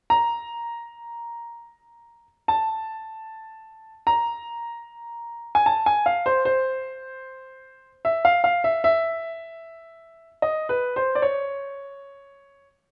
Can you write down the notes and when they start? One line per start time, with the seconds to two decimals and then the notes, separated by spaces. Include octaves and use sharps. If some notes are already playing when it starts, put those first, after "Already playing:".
0.10 A#5
2.48 A5
4.07 A#5
5.55 G#5
5.66 A5
5.86 G#5
6.06 F5
6.26 C5
6.45 C5
8.05 E5
8.25 F5
8.44 F5
8.64 E5
8.84 E5
10.42 D#5
10.69 B4
10.96 C5
11.15 D5
11.22 C#5